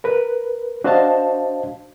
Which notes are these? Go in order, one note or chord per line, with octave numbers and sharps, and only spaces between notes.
A#4 B4
D4 F#4 C5 D#5 F5 A5